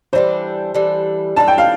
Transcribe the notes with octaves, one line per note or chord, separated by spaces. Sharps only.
E3 G3 D4 A4 C5
E3 G3 D4 A4
E3 G3 D4 A4 A5
G5
F5